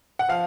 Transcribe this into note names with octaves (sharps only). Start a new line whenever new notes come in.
F#5
F3 F5